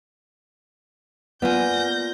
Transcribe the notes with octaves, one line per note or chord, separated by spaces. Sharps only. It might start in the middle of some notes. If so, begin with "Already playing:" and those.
A#3 B3 F4 D5 G#5 G6 A#6